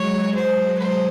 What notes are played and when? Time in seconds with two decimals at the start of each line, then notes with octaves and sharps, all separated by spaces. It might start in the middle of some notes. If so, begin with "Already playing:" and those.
Already playing: F#3 G#3 C#5
0.35 F#3 G#3 C5
0.79 C5